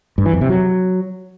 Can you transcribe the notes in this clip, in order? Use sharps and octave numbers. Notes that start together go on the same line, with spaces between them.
G2
E3
F2
C3
F#3